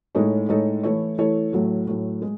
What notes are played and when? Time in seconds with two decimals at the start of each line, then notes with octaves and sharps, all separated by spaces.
0.15 A2 G#3 D#4 A4 C#5
0.49 A2 G#3 D#4 A4 C#5
0.83 E3 A3 E4 A4 C#5
1.18 E3 A3 E4 A4 C#5
1.53 A2 F#3 A3
1.87 A2 F#3 A3
2.22 G#3